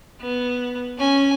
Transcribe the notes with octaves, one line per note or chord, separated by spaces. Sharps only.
B3
C#4 G#5